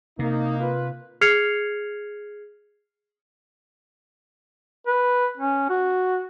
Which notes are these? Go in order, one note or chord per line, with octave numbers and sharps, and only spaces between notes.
C3 A#3 D#4
F4 B4
G#4 F6 G#6 C7 C#7 F7
B4
C#4
F#4